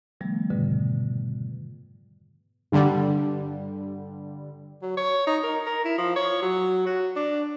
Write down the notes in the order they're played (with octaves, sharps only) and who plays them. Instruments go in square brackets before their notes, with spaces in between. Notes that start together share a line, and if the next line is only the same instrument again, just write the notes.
[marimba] C3 D#3 F3 G3 A3 B3
F2 G#2 B2 D3
[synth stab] G2 D3 G3
[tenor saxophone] F#3
C#5
D#4
A#4
A#4
E4
F3
C#5
F#3
F#4
D4